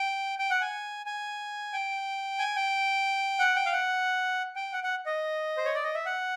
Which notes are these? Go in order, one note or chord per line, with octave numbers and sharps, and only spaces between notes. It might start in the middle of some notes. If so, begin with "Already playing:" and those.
Already playing: G5
G5
F#5
G#5
G#5
G5
G#5
G5
F#5
G5
F5
F#5
G5
F#5
F#5
D#5
C5
C#5
D5
D#5
E5
F#5